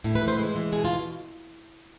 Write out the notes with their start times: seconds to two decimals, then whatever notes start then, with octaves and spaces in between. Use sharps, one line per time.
0.04 A2 E4
0.15 B4
0.22 E3
0.28 C5
0.38 G#3 C5
0.56 E3
0.72 B2 G#4
0.85 F4
0.90 B2